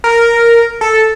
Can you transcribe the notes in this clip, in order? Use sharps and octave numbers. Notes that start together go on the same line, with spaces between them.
A#4
A4